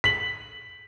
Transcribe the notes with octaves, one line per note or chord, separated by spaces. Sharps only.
B6 F#7